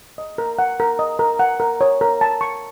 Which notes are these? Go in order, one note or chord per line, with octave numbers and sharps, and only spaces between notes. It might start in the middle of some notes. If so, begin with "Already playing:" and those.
D#5
A#4
F#5
A#4
D#5
A#4
F#5
A#4
C#5
A#4
A5
C#6